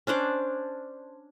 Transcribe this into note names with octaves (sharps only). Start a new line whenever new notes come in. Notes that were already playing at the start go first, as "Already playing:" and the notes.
C#4 D4 C5 D5